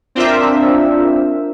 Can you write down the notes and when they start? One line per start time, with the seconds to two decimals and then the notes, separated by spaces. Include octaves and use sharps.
0.15 C4 D4 F4 A#4 C5 E5